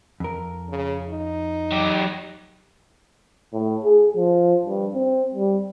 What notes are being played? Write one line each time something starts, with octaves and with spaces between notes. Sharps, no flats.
F2 A#4
C#3
D#4
F#3 G4
A2
G#4
F3
G2
C4
G3